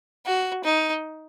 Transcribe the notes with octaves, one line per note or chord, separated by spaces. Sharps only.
F#4
D#4